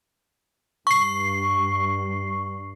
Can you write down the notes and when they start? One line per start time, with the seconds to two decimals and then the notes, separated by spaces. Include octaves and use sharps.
0.87 G2 C#6 C7